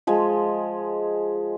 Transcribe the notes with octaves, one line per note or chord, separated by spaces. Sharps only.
F3 G#3 G#5